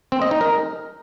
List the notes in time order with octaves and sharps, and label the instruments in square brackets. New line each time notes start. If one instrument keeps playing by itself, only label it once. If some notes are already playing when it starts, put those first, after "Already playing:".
[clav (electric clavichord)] C4
D#5
D#4
A#4